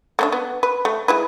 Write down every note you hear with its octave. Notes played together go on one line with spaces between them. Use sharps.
A3 B3 D4
B3
B4
A3
G#3 E4 B4